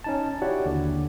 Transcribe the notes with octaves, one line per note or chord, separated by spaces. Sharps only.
C#4 D#4 A5
E4 F#4 G4 C#5 D5 F#5
D#2 D3